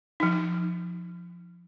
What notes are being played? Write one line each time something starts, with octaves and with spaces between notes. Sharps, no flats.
F3 D#4